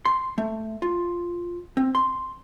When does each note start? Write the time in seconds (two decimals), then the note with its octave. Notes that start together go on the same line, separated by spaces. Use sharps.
0.05 C6
0.38 A3
0.82 F4
1.77 C4
1.95 C6